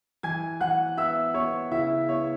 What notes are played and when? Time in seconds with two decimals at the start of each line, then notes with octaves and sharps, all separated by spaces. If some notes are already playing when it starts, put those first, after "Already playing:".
0.23 E3 G#5 G#6
0.61 E3 F#5 F#6
0.97 B3 E5 E6
1.34 B3 C#5 C#6
1.71 C#3 E4 E5
2.08 B3 C#5